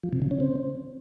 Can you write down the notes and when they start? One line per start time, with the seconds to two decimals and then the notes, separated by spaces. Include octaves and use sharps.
0.03 F3
0.13 C3
0.22 C#3
0.31 C#4
0.40 C4